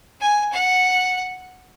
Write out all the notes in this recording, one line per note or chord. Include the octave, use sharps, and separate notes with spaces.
G#5
F#5